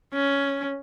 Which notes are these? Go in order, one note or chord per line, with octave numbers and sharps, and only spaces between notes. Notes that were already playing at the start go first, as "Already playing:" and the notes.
C#4